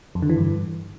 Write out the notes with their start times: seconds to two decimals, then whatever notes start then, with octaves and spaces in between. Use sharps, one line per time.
0.15 F2
0.22 D3
0.30 E3
0.37 G2